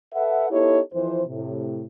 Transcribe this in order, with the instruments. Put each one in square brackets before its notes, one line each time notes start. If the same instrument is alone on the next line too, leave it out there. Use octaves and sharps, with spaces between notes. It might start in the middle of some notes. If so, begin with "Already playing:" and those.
[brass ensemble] A4 B4 E5 F#5
B3 D#4 E4 G4 A4 C#5
F2 E3 C5
A2 C3